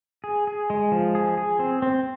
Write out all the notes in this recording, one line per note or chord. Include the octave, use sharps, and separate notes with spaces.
G#4
G#4
G#3
F3
G#4
G#4
C4
C4